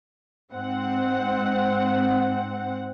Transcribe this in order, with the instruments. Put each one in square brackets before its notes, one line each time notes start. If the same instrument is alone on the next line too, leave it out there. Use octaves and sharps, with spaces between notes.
[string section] G#2 C4 F#5